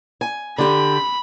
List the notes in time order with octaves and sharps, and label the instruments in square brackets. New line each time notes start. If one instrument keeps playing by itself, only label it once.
[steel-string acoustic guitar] G#5
[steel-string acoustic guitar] D3 G4 [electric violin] B5